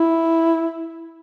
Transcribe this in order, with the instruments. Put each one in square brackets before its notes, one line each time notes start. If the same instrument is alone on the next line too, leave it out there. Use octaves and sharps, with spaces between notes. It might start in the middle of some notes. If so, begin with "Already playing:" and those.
Already playing: [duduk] E4